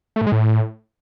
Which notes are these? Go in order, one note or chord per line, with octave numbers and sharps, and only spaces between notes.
A3
A2
G#3
A2